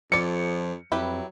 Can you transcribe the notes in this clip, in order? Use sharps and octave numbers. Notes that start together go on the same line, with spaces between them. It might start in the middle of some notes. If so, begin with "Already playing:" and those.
F2 F3 A4 D5 C#7
F2 F#3 E4 G4 B4